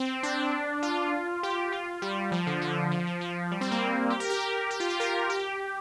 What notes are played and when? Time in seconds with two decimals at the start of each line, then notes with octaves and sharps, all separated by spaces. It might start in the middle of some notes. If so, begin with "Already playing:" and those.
Already playing: C4
0.23 D4
0.83 F4
1.43 G4
1.72 F4
2.02 G3
2.32 F3
2.47 D3
2.61 F3
2.91 F3
3.07 F3
3.21 F3
3.52 G3
3.61 C4
3.71 A#3
4.10 G4
4.20 A#4
4.30 G4
4.40 A#4
4.71 G4
4.80 F4
4.90 G4
5.00 A#4
5.30 G4